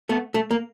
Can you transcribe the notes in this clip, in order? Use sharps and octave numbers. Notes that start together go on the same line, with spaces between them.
A3 B3
A3
A#3